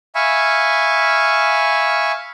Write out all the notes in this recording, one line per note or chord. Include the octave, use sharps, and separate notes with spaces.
E5 F5 G#5 B5 C#6